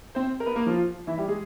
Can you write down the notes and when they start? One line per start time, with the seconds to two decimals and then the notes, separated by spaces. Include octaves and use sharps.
0.15 C4 C5
0.40 A#4
0.46 B3 B4
0.56 A#3 A#4
0.66 F3 F4
1.07 E3 E4
1.17 G3 G4
1.28 G#3 G#4